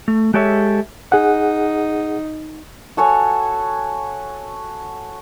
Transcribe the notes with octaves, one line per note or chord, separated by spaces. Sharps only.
A3
G#3 G4 A4 C#5 E5
D#4 G#4 F#5
F#4 A4 C#5 G#5